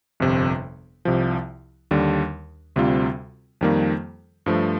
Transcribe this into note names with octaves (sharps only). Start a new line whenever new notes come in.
G1 F2 C3
C2 C3 F3
D#2 D3 G3 D4
D2 C3 G3 C4 F4
F2 D#3 G3 A#3
G2 F3 A3